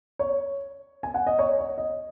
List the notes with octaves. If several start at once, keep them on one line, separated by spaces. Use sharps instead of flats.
C#5
G#5
F#5
D#5
C#5
C#5
D#5